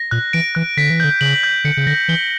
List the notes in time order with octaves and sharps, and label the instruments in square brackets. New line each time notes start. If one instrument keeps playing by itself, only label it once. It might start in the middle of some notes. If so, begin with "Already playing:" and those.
Already playing: [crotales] A#6
[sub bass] A#2 [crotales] F#6
[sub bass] E3 [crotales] D7
[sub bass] E3 [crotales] F#6
[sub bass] D3 [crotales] B6
[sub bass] E3
[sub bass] D3 [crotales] G6
[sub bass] C#3 [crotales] F#7
[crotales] G6
[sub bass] D3 [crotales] C#7
[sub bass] C#3
[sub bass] D3 [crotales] A#6
[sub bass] E3 [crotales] G7